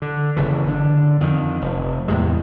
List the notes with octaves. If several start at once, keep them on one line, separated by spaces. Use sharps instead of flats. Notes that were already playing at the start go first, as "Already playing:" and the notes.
D3
F#1 C#3 E3
D3 D4
F2 D#3
F1
E2 A2 C3 G#3